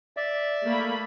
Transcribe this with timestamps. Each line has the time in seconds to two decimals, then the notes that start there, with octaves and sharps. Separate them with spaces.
0.17 D5 E5
0.64 A3 A#3 B5